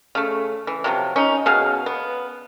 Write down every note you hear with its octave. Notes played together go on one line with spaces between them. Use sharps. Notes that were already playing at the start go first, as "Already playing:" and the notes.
C#3 A3
E3
C3 F3 F#3
C#4 D#4
B2 G#4 F5
B3